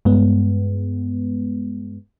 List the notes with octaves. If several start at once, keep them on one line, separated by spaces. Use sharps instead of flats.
G2 G#3 B3